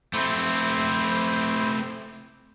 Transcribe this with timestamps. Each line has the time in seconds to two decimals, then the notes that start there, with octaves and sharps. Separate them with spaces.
0.14 A3 C4 E4 C5 D6